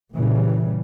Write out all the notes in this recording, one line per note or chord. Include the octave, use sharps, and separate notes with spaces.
A#2 C#3 E3 G3